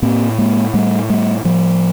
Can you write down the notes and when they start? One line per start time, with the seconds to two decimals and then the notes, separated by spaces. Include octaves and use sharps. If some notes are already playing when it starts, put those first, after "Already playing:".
0.02 A2 A#3 C4
0.38 G#3 A#3
0.74 A2 G3 A3
1.10 G3 A3
1.45 A2 F3 G3